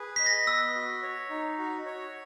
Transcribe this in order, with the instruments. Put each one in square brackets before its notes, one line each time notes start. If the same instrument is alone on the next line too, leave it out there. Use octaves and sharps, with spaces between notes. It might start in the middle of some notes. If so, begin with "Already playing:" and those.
Already playing: [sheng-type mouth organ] G#4 B4
[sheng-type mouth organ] D#5 [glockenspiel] B6
[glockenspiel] A#6
[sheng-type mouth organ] B3 [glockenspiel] E6
[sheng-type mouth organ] F#4
C#5
D#4
F#4
C#5